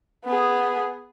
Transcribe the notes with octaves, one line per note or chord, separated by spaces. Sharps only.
B3 G#4